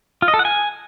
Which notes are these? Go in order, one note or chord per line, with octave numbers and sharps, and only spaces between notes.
F4
D#5
A4
F#5
G#5